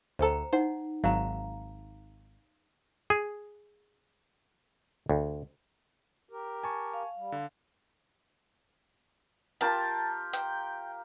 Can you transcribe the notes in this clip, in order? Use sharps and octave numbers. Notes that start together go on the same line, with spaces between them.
D2 A4 C5 G5 A#5
D#4 C5 F#5
G#1 F#3 F5 A#5
G#4
D2
G4 A#4
G#5 A5 C#6
F5
G3
D3
F4 G4 A#4 A5
G5